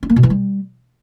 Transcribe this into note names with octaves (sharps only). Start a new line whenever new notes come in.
C#4
A#3
B2
E3
G3